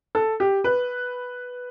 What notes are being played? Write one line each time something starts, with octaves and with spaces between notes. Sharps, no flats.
A4
G4
B4